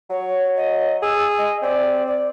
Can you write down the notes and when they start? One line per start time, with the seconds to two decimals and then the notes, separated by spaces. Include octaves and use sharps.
0.10 F#3 C#5
0.57 D#5
1.02 G#4 E6
1.38 D#5
1.62 C4 D5
2.07 D5